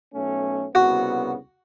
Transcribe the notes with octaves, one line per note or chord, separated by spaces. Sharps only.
B1 A3 C#4
C2 C#3 B3 F#4